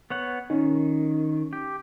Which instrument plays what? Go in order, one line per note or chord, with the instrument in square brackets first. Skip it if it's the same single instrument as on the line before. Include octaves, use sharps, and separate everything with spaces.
[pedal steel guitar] B3 C#5 F#5
[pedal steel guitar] D#3 [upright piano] C#4 [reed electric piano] D#4
[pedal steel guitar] G4